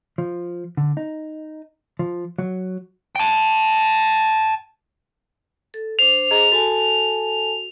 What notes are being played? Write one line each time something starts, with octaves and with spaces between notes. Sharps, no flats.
F3
D3
D#4
F3
F#3
G5 A5
A4
D4 C5 F7
G#4 D#5 A#5
F#4 A4 G#5 A5